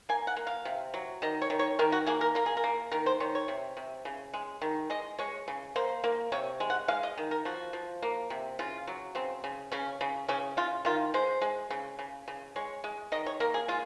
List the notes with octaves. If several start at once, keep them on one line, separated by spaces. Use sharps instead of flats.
A#3 G#5
F#5
A#3
F5
C3
F#3
D#3 D#5
C#5
D#3
C#5
D#3 A#4
F#4
A#3 G#4
A#4
A#3 A#4
G#4
A#4
A#3
D#3 A#4
C5
D#3 C#5
C#5
C3
C3
C#3
G#3
D#3
G#3 D#5
G#3 C#5
C#3
A#3 C5
A#3
C3 C#5
G#3
F#5
G#3 F5
D#5
D#3
A#4
F3 F#4
F3
A#3
C3
C#3 F4
F#3
C#3 C4
C#3
C#3 C#4
C#3
C#3 C#4
C#3 F4
D#3 F4
G#3 C5
G#3
C#3
C#3
C#3
G#3 C#5
G#3
D#3 D#5
C#5
A#3 A#4
G#4
G#3 F4